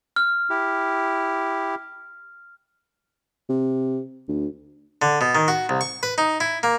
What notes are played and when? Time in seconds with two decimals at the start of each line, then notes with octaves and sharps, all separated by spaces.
0.16 F6
0.50 E4 G4
3.49 C3
4.28 D2
5.02 D3
5.21 B2
5.35 D#3
5.48 F#4
5.69 C2
5.81 C#6
6.03 B4
6.18 D#4
6.40 E4
6.63 A#3